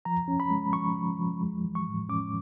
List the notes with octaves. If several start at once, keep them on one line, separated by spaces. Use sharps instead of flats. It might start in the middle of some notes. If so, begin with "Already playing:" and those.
F3 A#5
C#4
B5
G#3
F3 C#6
F3
F3
G#3
E3
C#6
A2
C#4 D6